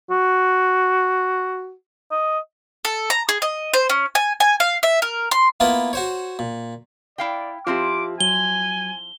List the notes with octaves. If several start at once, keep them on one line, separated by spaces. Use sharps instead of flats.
F#4
D#5
A4
A#5
G#4
D#5
C5
C#4
G#5
G#5
F5
E5
A#4
C6
A#3 B3 E4 F4 A#4 B4
F#4 C5 C#5
A#2
E4 D5 F5 G5
F3 C4 E4 F4 G4 D6
F#3 G#5 G7